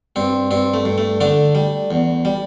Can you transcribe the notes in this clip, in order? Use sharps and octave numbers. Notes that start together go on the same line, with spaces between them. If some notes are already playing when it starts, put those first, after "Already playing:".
G2 C4
G2 C4
A3
G2
A3
D3 A3 D4
G3
E2
G3